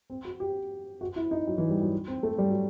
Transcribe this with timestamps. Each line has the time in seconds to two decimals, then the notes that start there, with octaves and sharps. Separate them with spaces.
0.10 C4
0.25 F#4
0.40 G4
1.01 F#4
1.16 E4
1.31 D#4
1.47 F#3
1.58 E3
1.70 G3
1.81 F#3
2.08 C4
2.23 A3
2.38 G3
2.50 F#3